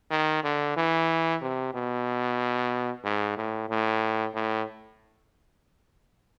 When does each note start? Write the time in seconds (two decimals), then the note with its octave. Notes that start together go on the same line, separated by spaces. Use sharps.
0.11 D#3
0.44 D3
0.77 E3
1.42 C3
1.74 B2
3.04 G#2
3.37 A2
3.70 A2
4.34 A2